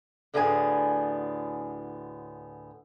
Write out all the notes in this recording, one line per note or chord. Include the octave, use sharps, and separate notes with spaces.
D2 A2 D3 B3 G#4 G#5